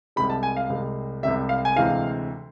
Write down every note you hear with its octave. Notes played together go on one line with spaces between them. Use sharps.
C2 C3 G#3 B5
A5
G#5
F5
C2 C3 G#3
C2 C3 G#3 E5
F5
G#5
D2 C3 E3 G#3 F5